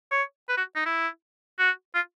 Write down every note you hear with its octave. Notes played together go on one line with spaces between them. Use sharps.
C#5
B4
F#4
D#4
E4
F#4
F4